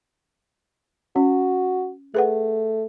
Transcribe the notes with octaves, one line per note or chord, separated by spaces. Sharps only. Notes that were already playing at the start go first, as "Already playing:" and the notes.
C#4 F#4
A3 G#4 B4 F#5